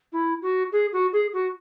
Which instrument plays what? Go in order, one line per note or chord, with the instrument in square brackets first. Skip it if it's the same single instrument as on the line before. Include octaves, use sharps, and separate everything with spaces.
[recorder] E4
F#4
G#4
F#4
G#4
F#4